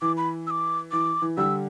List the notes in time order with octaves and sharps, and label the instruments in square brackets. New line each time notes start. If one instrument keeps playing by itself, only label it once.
[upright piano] E3 [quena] D6
[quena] B5
E6
D6
[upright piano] E3 [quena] D6
[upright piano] E3
[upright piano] D3 G3 [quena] E6